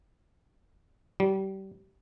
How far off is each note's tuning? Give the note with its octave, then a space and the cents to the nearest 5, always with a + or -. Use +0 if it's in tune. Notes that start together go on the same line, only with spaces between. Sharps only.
G3 -30